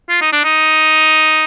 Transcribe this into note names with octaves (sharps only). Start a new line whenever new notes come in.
F4
D#4
D4
D#4